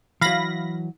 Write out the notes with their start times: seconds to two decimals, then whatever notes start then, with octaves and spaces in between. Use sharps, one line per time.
0.21 E3 F#3 F5 B5 A#6